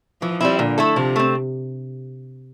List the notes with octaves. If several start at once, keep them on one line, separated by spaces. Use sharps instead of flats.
E3 F3
G3 C4 E4
A#2 D3
A3 E4 A4
C3 F3
A3 C4